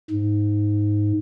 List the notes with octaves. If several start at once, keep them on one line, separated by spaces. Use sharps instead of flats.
G#2